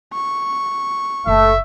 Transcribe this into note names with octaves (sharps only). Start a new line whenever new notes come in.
C#6
F#1 A#2 A3 E5